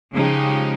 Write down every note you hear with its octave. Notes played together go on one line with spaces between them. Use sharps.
C#3 F3 G#3 D#4 G4